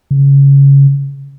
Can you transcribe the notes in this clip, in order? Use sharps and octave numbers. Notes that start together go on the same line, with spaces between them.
C#3